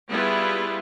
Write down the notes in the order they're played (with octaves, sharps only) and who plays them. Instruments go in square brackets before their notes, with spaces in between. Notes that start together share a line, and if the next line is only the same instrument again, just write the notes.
[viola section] G3 B3 E4 F4 G#4 B4